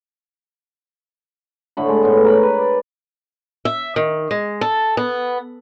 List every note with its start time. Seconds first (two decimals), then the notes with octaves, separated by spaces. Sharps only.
1.77 A2 D3 A3 B5
1.89 G#3
2.03 A2 B3
2.24 A#4 C#5 A5 B5
2.43 B4
2.58 D5
3.65 E5
3.96 D#3
4.31 G#3
4.61 A4
4.97 B3